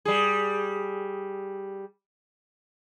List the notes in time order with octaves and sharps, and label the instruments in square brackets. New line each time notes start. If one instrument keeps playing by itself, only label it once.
[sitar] G3 G#4